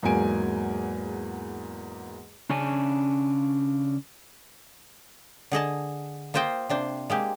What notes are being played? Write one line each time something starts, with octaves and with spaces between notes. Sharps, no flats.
E2 G#2 F#3 A#3 G#5 D7
C#3 C#4 D4 G#5
D3 G#4 D#5 A5
A#3 F4 C5 D#5 G5
C3 D4 C5
G#3 A#3 G4